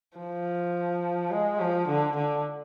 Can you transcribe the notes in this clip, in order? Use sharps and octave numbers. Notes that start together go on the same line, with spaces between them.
F3
G#3
F3
D3
D3